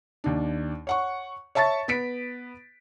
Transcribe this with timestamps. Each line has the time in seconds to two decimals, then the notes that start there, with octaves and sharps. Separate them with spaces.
0.24 D#2 D4
0.87 C#5 F#5 C#6
1.55 C#5 E5 A5 C#6 A6
1.88 B3 B6 D7